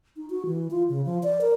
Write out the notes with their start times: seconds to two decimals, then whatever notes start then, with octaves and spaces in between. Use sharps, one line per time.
0.16 D#4
0.30 F#4
0.46 E3
0.71 F4
0.89 C#3
1.05 F3
1.23 D5
1.41 A#4